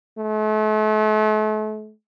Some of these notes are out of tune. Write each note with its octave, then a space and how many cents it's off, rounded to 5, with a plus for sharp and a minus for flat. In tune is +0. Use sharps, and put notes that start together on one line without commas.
A3 -40